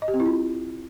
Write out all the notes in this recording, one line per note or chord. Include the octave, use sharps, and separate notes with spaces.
D#5
G4
C4
E4
F4